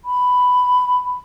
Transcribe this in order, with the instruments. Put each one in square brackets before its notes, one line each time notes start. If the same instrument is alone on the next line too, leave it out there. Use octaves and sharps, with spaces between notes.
[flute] B5